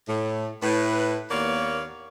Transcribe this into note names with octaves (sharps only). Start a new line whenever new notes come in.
A2
A2 B4
D#2 A#3 B3 C#5 D5 F5